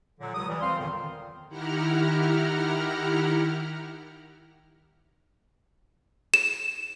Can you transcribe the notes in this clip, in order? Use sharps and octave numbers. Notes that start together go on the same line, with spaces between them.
A#2 D3 F#3
C#2 C3 F#3 D#6
C#2 E3 G3
C4 C5 F5 C6
E2 A#2 D3 D#3
D#3 E4 G4 F#5 A#5 F6
E7